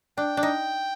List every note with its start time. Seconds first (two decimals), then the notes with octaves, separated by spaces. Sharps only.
0.18 D4 G5
0.37 D4
0.43 D#4